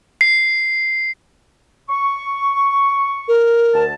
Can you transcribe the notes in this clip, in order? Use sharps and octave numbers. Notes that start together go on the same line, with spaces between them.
C7
C#6
A#4
D2 A5